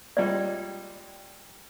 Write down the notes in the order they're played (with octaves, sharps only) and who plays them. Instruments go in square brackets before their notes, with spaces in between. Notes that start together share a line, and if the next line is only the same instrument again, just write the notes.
[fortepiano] A#2 G3 G#3 [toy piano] D5 G5